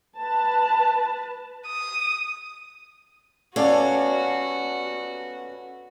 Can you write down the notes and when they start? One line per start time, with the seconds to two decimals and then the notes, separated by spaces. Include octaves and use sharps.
0.16 B4 A5
1.67 D#6
3.56 B3 C#4 F#4 A4 D5 F5 A5